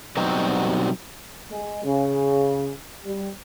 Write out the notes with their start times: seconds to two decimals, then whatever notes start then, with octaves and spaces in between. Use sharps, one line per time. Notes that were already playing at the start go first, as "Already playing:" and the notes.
0.17 B2 F#3 G3 C4 D#4 F#4
1.50 G#3
1.84 C#3
3.04 G3